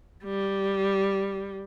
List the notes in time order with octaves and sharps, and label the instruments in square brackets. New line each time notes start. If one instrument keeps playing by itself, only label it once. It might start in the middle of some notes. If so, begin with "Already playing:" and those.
[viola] G3